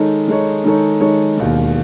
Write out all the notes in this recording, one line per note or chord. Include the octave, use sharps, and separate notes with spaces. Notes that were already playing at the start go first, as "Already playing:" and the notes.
Already playing: D#3 G#3 D#4 A4 C#5
D#3 G#3 D#4 A4 C#5
D#3 G#3 D#4 A4 C#5
D#3 G#3 D#4 A4 C#5
E1 D#2 D#3